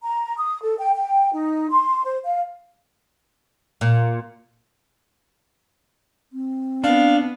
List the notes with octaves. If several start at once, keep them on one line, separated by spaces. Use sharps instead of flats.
A#5
D#6
A4
G5
G5
D#4
C6
C5
F5
A#2
C4
B3 D4 F5